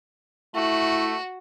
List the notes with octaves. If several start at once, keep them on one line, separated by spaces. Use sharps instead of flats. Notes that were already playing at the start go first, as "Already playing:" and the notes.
A3 E4 F#4